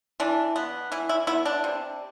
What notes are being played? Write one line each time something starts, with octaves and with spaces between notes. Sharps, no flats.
E3 D4
B3
E3 E4
E4
B3 E4
D4
C3